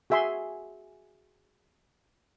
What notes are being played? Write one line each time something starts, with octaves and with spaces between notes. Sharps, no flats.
F#4 G#4 E5 G#5 C6